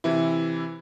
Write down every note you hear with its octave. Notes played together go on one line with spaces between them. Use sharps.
C3 E3 E4